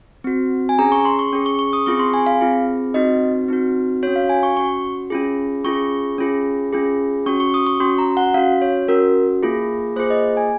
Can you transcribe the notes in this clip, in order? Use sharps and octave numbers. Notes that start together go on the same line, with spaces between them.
C4 F#4
G#5
C#4 G#4 A#5
C#6
C6
C#6
C#4 G#4
C#6
C#6
D#6
C4 F4 G#4 C#6
C6
G#5
F5
C4 F4 G#4
C4 D#4 F#4 D#5
C4 D#4 F#4
C#4 F#4 C#5
F5
G#5
C#6
C#4 F#4 C#6
C#4 F4 G#4
C#4 F4 G#4 C#6
C#4 F4 G#4
C#4 F4 G#4
C#4 F#4 C#6
C#6
D#6
C#6
C#4 F#4 C6
A#5
F#5
C#4 F#4 F5
C#5
C#4 F#4 A#4
A#3 F4 G#4
A#3 F4 G#4 C5
D#5
G#5